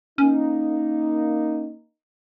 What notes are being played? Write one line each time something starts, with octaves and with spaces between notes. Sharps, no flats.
A#3 C#4 D#4